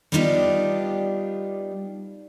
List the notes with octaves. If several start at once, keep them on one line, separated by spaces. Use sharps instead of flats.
G3 B3 D4 D#4 F4 G4